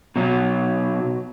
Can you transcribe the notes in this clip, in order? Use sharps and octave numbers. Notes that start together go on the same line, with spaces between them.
B2 F#3